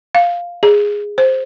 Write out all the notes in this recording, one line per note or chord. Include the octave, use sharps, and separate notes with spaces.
F5
G#4
C5